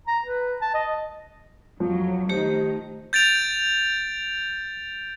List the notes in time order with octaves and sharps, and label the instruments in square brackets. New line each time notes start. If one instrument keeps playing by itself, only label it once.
[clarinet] A#5
B4
A5
D#5
[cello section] F2 F#3 [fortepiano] F3
[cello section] D#3 D#4 [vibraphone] A3 G4 C5
[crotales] G6 A6 D7 F7